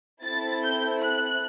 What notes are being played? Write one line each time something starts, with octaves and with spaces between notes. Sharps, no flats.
C4 E4 A4 A6
G6
F#6